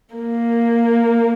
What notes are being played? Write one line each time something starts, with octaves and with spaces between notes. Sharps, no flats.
A#3